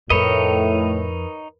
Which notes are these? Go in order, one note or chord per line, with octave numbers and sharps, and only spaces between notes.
F2 A2 D#4 A#4 B4 C#5 D#5 B5